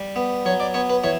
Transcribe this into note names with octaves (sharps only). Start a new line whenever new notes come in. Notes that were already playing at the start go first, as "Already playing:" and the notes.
Already playing: G3
B3
F#3 C#5
D5
B3 C#5
B4
E3 C#5